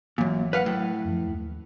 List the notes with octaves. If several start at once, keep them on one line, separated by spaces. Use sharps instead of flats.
G#1 F#2 A#2 E3 F#3
B4 F5 F#5
A2 F#3
F#2 F3
D#2